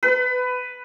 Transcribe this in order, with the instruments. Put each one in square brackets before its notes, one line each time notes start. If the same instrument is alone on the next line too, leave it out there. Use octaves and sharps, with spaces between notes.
[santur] B4